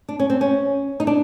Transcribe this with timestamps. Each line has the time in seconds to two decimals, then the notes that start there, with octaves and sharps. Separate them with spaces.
0.08 D4
0.19 C#4
0.30 C4
0.41 C#4
1.00 D#4
1.07 D4